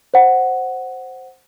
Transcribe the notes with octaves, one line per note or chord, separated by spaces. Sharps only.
C5 F#5